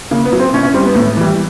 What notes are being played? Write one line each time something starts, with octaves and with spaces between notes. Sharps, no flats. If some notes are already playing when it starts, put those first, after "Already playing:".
C#3 A#3
B3
F#3
C4
B2 C#4
C#4
G3 C4
B3
A2
E3 G3